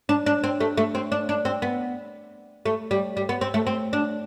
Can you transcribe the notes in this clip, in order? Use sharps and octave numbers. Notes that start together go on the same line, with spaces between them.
D4
D4
C4
A3
A3
C4
D4
D4
C4
B3
A3
G3
G3
B3
C4
A3
C4
D4